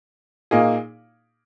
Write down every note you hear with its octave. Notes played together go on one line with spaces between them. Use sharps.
A#2 A#3 D#4 G#4